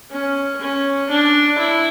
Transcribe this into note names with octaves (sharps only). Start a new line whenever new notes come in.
C#4
C#4
D4
E4